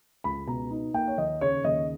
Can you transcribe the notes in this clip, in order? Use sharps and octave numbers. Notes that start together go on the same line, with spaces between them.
C#2 B5
B2 A#5
D#4
A#3 G5
C#5
D#2 D#5
C#3 C#5
D#2 D#5